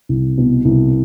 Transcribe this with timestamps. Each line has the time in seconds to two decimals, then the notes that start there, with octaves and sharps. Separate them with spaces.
0.09 C2
0.38 B2
0.65 C2